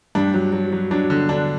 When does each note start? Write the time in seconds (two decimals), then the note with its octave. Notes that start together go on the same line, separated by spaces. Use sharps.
0.15 G2 D4
0.34 F#3
0.53 F#3
0.72 F#3
0.91 F#3 D4
1.10 D3
1.29 D3 D4